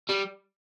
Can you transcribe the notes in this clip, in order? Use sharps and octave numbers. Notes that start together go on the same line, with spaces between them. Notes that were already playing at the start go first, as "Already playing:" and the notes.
G3